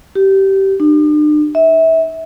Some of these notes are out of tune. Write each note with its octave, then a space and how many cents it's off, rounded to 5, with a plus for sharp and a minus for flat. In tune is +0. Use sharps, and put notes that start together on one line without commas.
G4 -20
D4 +45
E5 -25